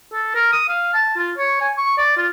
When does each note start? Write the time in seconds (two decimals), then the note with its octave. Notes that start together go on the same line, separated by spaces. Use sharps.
0.13 A4
0.35 A#4
0.52 D#6
0.68 F5
0.94 A5
1.17 F4
1.38 C#5
1.61 G#5
1.77 C#6
1.98 D5
2.17 F4